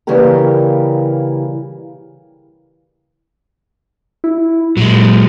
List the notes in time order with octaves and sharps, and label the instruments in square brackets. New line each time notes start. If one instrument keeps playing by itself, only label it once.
[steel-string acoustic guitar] C#3 E3 G3 A#3 G4 A#4
[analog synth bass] E4
[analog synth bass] A#2 [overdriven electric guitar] F#3 G#3